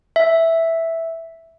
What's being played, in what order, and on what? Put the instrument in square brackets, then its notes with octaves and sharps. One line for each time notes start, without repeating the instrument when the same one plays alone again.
[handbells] E5